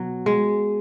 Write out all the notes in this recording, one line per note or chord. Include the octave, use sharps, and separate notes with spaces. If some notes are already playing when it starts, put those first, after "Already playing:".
Already playing: B2 F#3
G#3